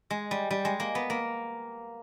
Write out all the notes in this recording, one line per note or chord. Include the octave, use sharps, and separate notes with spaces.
G#3
G3
G3
G#3
A#3
B3
A#3